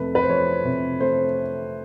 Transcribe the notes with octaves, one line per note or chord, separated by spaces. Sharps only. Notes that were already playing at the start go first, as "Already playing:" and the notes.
Already playing: F2 C3 A3 B4
B4
C5
F3 C#5
C3
A3 C5